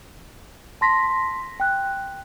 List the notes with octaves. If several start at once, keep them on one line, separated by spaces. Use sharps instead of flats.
A5 C6 A#6 B6
G5 F#6